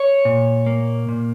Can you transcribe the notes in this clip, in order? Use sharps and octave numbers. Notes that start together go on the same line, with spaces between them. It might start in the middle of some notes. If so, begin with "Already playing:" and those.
Already playing: C#5
A#2
A#3
A#2